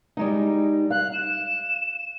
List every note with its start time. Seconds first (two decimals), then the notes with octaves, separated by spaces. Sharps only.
0.17 G3 G#3 D#4
0.90 F5 F#6
1.13 E7